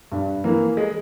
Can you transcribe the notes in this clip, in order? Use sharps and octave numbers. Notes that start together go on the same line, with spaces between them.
G2
E3 A#3
G#3